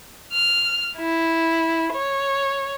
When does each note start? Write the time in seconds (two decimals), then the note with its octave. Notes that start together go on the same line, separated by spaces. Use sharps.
0.33 F6
0.98 E4
1.93 C#5